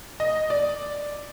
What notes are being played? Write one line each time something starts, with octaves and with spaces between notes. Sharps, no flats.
D#5
D5